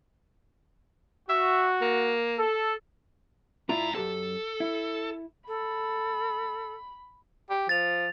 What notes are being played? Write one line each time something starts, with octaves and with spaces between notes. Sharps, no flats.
F#4 E5
A#3
A4
G#2 D4 E4 F4 A#5
F#2 G4 A4 A5
E4
A4 B5
G4
F3 A6 F7